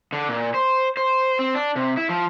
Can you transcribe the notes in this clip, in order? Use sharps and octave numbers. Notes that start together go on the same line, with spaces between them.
D3
A#2
C5
C5
C4
D4
C3
E4
F3